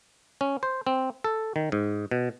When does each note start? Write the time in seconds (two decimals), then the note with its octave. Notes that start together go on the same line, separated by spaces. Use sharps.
0.41 C#4
0.63 C5
0.87 C4
1.24 A4
1.56 D#3
1.72 G#2
2.11 B2